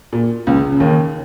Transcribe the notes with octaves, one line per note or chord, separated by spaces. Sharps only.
A#2
C#2 C#3
C#3
D#2 D#3